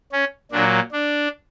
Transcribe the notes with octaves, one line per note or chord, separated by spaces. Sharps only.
C#4
A#2 F#3 A#3 D4
D4